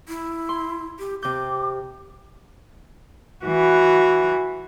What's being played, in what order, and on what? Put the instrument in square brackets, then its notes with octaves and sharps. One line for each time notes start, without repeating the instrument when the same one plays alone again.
[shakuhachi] E4
[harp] C6
[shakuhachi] G4
[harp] C3 G6 [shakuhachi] D6
[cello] E3 F#4